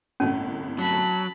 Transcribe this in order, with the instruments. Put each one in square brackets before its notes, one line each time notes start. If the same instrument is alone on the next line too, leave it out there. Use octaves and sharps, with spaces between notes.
[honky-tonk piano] G1 C2 A2 [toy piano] C#4
[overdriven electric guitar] F#3 [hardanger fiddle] A5 B5